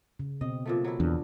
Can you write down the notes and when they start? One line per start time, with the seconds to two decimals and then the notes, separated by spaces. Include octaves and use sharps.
0.19 C#3
0.41 B2 C4 D#5
0.66 A#2 F3 A3
0.84 F#3 E4
1.00 E2 D4